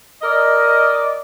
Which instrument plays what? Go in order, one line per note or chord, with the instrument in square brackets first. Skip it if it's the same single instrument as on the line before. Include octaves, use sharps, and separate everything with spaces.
[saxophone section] A#4 D5 D#5